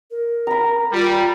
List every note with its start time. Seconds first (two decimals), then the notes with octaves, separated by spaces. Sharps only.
0.11 A#4
0.47 A#5 B5
0.92 G3 F4